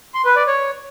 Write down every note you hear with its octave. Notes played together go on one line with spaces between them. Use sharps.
C6
B4
D5
C#5